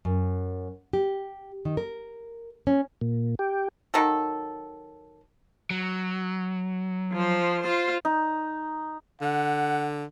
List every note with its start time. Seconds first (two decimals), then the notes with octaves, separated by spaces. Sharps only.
0.05 F#2
0.93 G4
1.65 D#3
1.77 A#4
2.67 C#4
3.01 A#2
3.39 G4
3.94 D#3 F#3 A4
5.70 F#3
7.13 F3 C5
7.63 F4 C5
8.05 D#4
9.22 D3 F#5